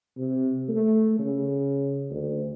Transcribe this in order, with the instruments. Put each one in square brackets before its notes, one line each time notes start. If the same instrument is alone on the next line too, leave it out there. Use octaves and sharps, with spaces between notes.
[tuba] C3
A3
C#3
D2